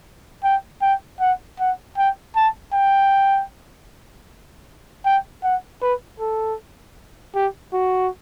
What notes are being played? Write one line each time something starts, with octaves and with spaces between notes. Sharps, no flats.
G5
G5
F#5
F#5
G5
A5
G5
G5
F#5
B4
A4
G4
F#4